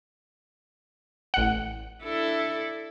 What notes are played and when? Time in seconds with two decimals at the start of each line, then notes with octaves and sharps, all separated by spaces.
1.34 A1 F#5
2.03 D4 E4 A4